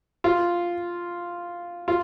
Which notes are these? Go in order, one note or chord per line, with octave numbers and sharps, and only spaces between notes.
F4
F4